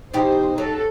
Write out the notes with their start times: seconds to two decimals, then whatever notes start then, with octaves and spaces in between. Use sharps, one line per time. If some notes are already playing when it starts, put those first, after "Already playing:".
0.13 B2 E3 D#4 G4 C5
0.58 F#3 A4